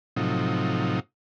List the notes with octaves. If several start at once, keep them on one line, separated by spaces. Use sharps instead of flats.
A2 C3 F3 F#3 D#4